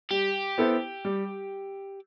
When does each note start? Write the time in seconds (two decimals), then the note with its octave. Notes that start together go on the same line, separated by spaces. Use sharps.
0.11 G3 G4
0.58 B3 E4 A4 C5
1.05 G3